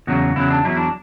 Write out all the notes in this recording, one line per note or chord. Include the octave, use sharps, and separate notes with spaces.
E2 C#3 F#3 F#4
E2 C#3 F#3 E4
D4
E2 C#3 F#3 E4
D4